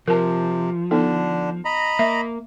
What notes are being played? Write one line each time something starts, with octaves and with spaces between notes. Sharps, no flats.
C3 F3 A#4 A5
D3 B3 D4 D#4 A4
D#5 A#5 B5
A#3 E5